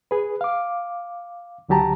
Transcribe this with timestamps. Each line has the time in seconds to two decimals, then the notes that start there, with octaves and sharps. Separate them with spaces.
0.11 G#4 B4
0.41 F5 D6
1.69 C#2 D3 F#3 G4 A5 A#5